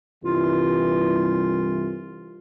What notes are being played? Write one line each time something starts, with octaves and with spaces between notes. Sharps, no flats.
C2 G2 E3 F4